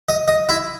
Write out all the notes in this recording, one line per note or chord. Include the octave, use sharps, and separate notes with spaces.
D#5
D#5
E4